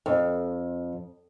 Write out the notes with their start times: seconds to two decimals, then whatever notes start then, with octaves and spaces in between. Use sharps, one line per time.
0.06 F2